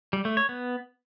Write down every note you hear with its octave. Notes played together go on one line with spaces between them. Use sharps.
G3
A3
C#5
B3